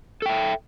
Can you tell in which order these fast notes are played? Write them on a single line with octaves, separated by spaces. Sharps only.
A4 G5 E5